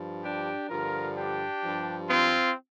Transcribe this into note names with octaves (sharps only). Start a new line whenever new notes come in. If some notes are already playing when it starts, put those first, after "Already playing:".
Already playing: G2 F3
D4 G4
G2 D3 F3 F4 A#4
D4 G4
G2 F3
C4 F4